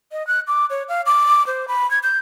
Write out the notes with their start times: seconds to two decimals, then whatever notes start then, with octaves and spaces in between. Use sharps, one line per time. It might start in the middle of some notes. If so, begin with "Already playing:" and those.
0.12 D#5
0.27 F#6
0.48 D6
0.70 C#5
0.89 F5
1.06 D6
1.47 C5
1.68 B5
1.91 G#6
2.03 G6